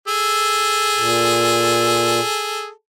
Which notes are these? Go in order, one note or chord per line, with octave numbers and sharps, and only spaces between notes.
G#4 A4
A#2